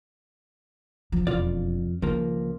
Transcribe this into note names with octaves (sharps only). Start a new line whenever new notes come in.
F3
E1 F2 F4 D5
C#2 D#3 F3 A#3